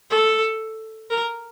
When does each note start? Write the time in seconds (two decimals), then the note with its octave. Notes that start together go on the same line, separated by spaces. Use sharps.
0.11 A4
1.10 A#4